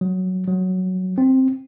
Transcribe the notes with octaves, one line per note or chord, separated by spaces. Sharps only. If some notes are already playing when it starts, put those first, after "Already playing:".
F#3
F#3
C4